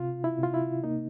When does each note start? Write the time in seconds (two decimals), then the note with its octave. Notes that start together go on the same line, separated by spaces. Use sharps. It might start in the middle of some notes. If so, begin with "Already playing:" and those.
Already playing: C3 F4
0.24 E4
0.39 C3 F4
0.54 E4
0.84 A#3 D#4